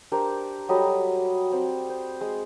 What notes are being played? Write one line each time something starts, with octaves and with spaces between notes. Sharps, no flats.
D4 G4 A#4 C5
F#3 G3 A4 D#5
C4
C5
G#3